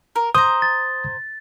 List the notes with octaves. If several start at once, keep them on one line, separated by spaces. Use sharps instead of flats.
A#4
C5 A#5 D#6
A6